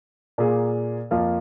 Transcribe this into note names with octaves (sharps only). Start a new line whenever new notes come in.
A#2 A#3 G#4
F2 F3 A#3 F4